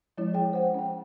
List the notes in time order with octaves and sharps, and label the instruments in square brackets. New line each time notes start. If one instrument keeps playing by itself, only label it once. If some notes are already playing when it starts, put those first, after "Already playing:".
[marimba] F3 G#3 C#4 E4 C#5
G#4 G5
C5 F#5
C#4 G5